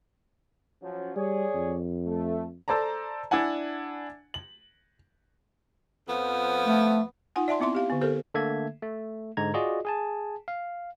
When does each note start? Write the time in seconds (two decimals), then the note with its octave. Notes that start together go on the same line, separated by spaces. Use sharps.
0.82 F3 F#3 C#4
1.16 G3 G#4 C#5 D5
1.55 F2
2.07 A3
2.68 A4 C5 D5 A5 A#5
3.31 D4 E4 D5 F#5 G#5
4.34 F#7
6.08 F2 F3 B3
6.65 A3
7.36 D#4 F4 F#5 G#5
7.48 D5 E5 A5 C6
7.60 B3 C4 E4 E5 C6
7.75 G4 F5
7.90 D3 B3
8.01 G4 A4 A#4 C5
8.34 D3 A3 A#3 A4 E5 G#6
8.82 A3
9.37 G#2 D3 G#3 A#5 G#6
9.54 F4 F#4 G#4 D5 D#5
9.85 G#4 G#5 A5
10.48 F5